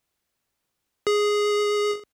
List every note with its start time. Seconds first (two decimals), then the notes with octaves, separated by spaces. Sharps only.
1.07 G#4